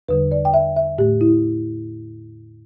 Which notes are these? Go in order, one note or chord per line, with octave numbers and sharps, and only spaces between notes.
E2 D3 G3 B4
D5
G5
E5
E5
A2 A3 G4
E4